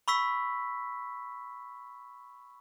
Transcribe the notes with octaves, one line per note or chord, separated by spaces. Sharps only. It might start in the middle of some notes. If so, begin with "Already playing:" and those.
B5 C#6 E6 B6